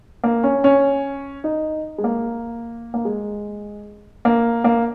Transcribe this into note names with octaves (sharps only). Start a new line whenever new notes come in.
A#3
C#4
C#4
D#4
G#3
A#3
A#3
G#3
A#3
A#3